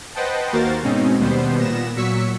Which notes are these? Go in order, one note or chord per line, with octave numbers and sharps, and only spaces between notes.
B4 C5 D#5 F#5 G5 A5
D#2 A#3 F#4 A#4 C5 A6
G#2 B2 C4 C#4 D#4
D#2 B2 G3 B3 C5
A#2 B3 A#6 E7
A#2 F#3 C#6 E6 B6 C#7